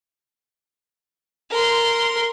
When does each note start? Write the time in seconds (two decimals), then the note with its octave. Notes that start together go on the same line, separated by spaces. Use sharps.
1.51 A#4 C6